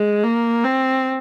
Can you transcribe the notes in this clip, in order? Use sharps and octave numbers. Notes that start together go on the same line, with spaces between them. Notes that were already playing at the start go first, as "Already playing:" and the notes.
Already playing: G#3
A#3
C4